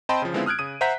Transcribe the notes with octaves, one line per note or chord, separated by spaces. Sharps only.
C4 D#5 G5 A5 B5 C6
C#3 F3
D3 G#3 B3 C4 E4 F4
D#6 F6 F#6 G#6 D7
C#3 D#6 D#7
C5 E5 F#5 A#5 G6 B6